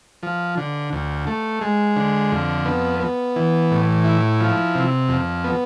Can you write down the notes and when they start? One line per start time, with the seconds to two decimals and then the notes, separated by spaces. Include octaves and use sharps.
0.23 F3
0.57 D3
0.93 D2
1.27 A3
1.61 G#3
1.96 D3
2.32 F2
2.65 B3
3.00 B3
3.36 E3
3.71 A2
4.04 E4
4.40 F3
4.75 C3
5.09 F2
5.44 B3